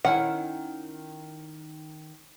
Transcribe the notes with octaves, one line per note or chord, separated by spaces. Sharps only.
D#3 C#4 E4 F#5